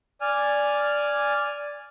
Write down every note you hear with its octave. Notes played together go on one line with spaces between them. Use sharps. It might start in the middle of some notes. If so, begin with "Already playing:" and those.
D5 G#5 F6